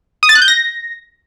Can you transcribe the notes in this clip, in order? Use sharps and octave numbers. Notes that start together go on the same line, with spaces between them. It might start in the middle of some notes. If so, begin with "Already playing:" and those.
D#6
A6
F#6
G6
A#6